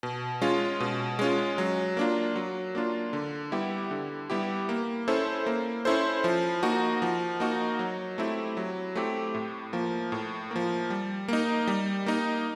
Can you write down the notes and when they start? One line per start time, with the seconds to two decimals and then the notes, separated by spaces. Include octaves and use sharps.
0.03 B2
0.42 G#3 C#4 F4
0.80 B2
1.19 G#3 C#4 F4
1.58 F#3
1.97 A#3 D4 F4
2.35 F#3
2.75 A#3 D4 F4
3.13 D3
3.52 G3 B3 E4 G4
3.91 D3
4.30 G3 B3 E4 G4
4.69 A#3
5.08 C#4 E4 A4 C5
5.46 A#3
5.85 C#4 E4 A4 C5
6.24 F3
6.63 A#3 D#4 F#4
7.02 F3
7.40 A#3 D#4 F#4
7.79 F#3
8.18 A3 C4 E4 G4
8.57 F#3
8.95 A3 C4 E4 G4
9.34 A2
9.73 F3 A#3
10.12 A2
10.51 F3 A#3
10.90 G3
11.28 A#3 D#4
11.67 G3
12.06 A#3 D#4